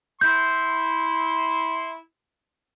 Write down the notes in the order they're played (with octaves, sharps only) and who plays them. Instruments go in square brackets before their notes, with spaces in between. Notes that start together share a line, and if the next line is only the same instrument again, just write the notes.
[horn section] E4 C6 [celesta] G6